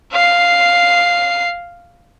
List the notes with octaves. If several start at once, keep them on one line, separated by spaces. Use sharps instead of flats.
F5 C7